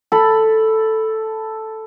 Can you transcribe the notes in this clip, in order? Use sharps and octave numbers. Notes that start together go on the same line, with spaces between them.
A4 B5